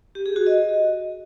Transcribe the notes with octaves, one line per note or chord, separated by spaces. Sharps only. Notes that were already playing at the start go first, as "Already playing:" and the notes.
G4
G#4
F#4
D#5